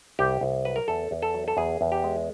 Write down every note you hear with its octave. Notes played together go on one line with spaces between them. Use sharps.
C2 G4
C2
F#3 B4
A#4
E2 A4
E2
A4
F#3
A4
E2 G#4
E2
G4
G#3